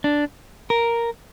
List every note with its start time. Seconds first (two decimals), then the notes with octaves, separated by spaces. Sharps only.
0.04 D4
0.70 A#4